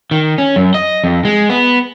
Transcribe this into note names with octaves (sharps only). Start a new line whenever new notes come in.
D#3
C#4
F#2
D#5
F2
G#3
B3